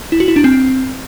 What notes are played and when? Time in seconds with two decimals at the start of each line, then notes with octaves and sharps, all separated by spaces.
0.12 E4
0.20 F#4
0.28 E4
0.36 D4
0.44 C4